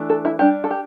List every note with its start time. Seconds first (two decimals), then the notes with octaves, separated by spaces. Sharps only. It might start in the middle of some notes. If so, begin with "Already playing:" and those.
Already playing: E3 A3 D4
0.10 A4
0.25 E4
0.39 G3 D4 G4
0.64 A4
0.71 G4